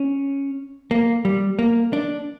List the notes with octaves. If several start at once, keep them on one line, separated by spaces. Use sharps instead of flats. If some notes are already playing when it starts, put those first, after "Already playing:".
Already playing: C#4
A#3
G3
A#3
D4